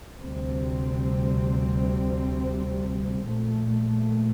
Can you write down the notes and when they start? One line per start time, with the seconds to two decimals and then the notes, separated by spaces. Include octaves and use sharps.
0.21 D2 C3 G3 C4
3.27 A#1 A#2 A3